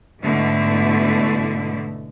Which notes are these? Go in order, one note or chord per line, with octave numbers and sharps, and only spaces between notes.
G#2 B2 D3 A3 E4